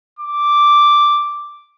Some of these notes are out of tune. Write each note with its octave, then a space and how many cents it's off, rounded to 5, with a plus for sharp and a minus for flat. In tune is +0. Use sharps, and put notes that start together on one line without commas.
D6 +0